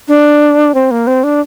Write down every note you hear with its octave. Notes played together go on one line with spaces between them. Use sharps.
D4
C4
A#3
C4
D4